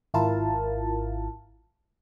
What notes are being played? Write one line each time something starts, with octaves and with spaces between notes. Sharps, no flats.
G#1 E4 F4 A#4 F5 A5